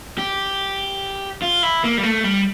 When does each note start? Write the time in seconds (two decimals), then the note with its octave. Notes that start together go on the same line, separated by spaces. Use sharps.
0.18 G4
1.42 F4
1.63 E4
1.84 A#3
1.98 G3
2.03 A3
2.24 G3